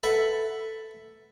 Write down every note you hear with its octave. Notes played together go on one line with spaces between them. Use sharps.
A4 B4 E5 F#5